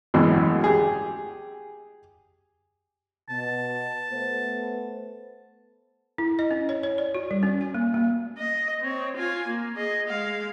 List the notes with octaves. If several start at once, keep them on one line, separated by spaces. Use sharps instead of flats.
G#1 F#2 B2 E3 F#3
G4 G#4
B2 A5
A3 B3 C5
E4
D#5
C#4
C#5
C#5
D5
F#4
G3
C#4
G#5
A#3
A#3
D#5
C4 C#5
F4 G#5
A#3
G#4 D#5
G#3 F5